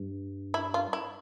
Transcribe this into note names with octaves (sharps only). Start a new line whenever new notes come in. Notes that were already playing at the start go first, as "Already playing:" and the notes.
Already playing: G2
E4
F4
E4